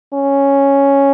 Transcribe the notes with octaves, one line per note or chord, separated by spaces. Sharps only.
C#4